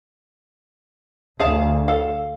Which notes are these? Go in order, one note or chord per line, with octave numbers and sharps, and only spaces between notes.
D2 G#4 F5 A5
A4 F5